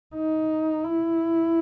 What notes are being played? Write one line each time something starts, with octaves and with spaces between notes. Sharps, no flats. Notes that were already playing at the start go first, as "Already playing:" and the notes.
D#4
E4